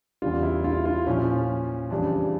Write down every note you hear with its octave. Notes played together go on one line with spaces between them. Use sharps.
E2 C#3 G3 F4
E4
F4
F4
A#2 F3 C#4
F2 C#3 E3 G3 D4